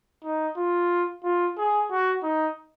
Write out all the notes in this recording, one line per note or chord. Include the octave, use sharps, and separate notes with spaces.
D#4
F4
F4
G#4
F#4
D#4